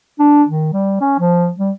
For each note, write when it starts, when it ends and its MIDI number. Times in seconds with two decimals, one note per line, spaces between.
0.19 0.43 62
0.48 0.71 51
0.73 0.98 55
1.01 1.19 61
1.20 1.50 53
1.59 1.72 55